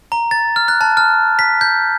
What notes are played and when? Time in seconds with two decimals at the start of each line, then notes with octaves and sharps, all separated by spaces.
0.12 A#5
0.31 A6
0.56 F6
0.68 F#6
0.81 A5
0.97 F6
1.39 B6
1.61 G6